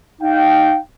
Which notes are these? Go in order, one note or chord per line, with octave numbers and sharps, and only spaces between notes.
D#4 F5 G5